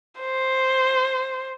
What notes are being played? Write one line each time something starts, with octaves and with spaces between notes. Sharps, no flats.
C5